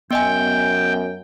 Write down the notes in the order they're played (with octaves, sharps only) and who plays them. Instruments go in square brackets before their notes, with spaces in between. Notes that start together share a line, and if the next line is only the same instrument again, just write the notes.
[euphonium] F#2 [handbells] B3 D#5 G#5 [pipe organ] G5